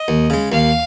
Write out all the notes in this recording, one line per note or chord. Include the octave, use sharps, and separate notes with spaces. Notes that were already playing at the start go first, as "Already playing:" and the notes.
Already playing: D#5
D#2
C#3 G#3
D#2 F5